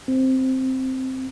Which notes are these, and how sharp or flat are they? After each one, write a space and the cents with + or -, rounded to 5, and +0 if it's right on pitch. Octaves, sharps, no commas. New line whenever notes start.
C4 +0